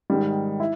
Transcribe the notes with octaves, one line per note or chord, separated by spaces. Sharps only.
G#2 D#3 G3
E4